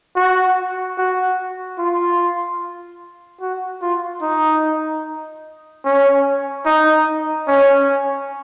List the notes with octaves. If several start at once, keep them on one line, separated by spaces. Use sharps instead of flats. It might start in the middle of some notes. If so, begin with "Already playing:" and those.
F#4
F#4
F4
F#4
F4
D#4
C#4
D#4
C#4